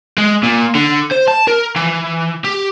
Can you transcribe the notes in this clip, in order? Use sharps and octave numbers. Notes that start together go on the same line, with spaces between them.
G#3
A#2
D3
C5
A5
A#4
E3
G4